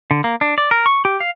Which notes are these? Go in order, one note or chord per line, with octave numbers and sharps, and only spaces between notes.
D3
A#3
D4
D5
A#4
C#6
G4
F5